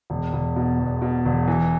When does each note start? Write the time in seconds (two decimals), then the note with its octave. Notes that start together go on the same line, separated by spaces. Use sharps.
0.10 E1
0.33 E1
0.56 B2
0.79 E2
1.02 B2
1.25 E1
1.48 E3